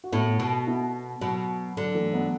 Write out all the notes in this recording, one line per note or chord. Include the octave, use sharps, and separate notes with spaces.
F#4
A2 B3 E4
B2
B3 E4
B2 F#3
D3 F#3
E3 A3
F#3 B3